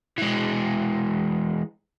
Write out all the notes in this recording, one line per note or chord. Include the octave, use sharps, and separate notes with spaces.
E3 G#3